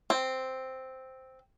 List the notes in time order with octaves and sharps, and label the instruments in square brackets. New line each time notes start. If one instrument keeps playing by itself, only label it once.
[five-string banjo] C4